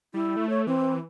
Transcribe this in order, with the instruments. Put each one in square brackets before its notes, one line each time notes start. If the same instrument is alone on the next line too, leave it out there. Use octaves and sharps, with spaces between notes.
[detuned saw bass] G3 [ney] E4
[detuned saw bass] A3
[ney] C#5
[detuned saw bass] E3 [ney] C4